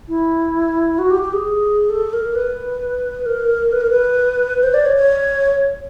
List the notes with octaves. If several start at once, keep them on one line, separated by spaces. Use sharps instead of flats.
E4
F#4
G4
G4
G#4
A4
A#4
B4
A#4
B4
A#4
B4
C5
D5
C#5
C#5